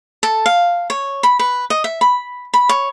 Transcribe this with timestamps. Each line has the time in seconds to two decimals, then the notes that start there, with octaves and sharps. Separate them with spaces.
0.23 A4
0.46 F5
0.90 C#5
1.23 B5
1.39 B4
1.70 D#5
1.84 E5
2.01 B5
2.54 B5
2.69 C#5